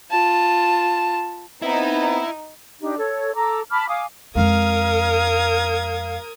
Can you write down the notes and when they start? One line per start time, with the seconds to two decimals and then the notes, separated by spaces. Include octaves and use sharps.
0.11 F4 A5
1.62 B3 C4 D#4 E4
2.81 D4 D#4 G4
2.97 A4 C#5
3.34 A4 A#5 D6 E6
3.70 A5 B5 D6 F6
3.89 F5 G#5 D6 D#6
4.35 F2 G#3 A#4 F5 D#6 G#6